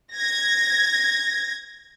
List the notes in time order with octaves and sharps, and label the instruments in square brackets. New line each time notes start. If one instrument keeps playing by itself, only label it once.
[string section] G#6 A#6